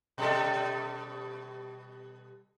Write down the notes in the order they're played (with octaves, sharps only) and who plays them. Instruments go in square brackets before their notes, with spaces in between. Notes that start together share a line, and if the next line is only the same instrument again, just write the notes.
[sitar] B2 G3 A4